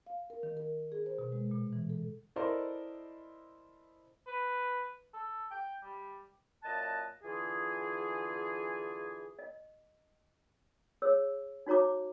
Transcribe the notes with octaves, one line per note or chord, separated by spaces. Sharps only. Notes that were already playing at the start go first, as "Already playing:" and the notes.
F5
A#4
D#3
A#4
G#4
C5
B2
G#3
A#2
E3
A4
E4 A4 A#4 C5 D5 D#5
B4
A4
G5
G3
F#2 A#2 D#5 F#5 A5
D3 E3 F4 G#4
D#5
G#4 C#5 E6
D#4 F#4 C#5 A#5 D6